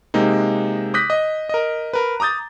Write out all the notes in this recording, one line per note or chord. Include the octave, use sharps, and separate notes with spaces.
C3 G#3 A#3 D#4
D6 D#6 F#6 G6 A#6 B6
D#5
A#4 D#5
A#4 B4
A#5 D6 D#6 G6 A6